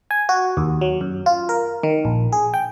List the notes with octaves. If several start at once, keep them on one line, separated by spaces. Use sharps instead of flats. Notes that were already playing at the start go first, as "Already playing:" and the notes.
G#5
F#4
D#2
F#3
F#2
F4
A#4
D#3
A#1
G#4
G5